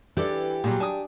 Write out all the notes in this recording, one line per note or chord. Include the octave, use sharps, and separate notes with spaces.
E3 D4 G4 A4 D5
A#2 F#3 G3 G#4
D4 G#5 D#6